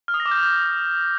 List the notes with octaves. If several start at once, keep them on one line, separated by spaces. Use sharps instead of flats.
F6
D#6
A#6
D6
G6